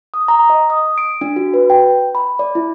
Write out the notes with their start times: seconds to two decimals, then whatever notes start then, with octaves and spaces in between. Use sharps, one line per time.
0.14 D#6
0.28 A#5
0.50 D#5
0.70 D#6
0.98 D7
1.21 D4
1.36 F#4
1.54 B4
1.70 G5
2.15 B5
2.39 D5
2.55 E4